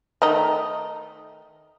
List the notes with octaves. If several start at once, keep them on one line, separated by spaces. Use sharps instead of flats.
D#3 A3 D#4